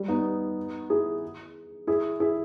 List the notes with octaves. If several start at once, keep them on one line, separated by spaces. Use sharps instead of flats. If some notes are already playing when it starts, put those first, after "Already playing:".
Already playing: G3
B3 D#4
E4 G#4
E4 G#4
E4 G#4